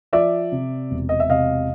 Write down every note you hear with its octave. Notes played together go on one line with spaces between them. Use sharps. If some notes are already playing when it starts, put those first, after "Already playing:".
F3 D5 E5
C3
E1
D#5
E5
C3 D#5 F5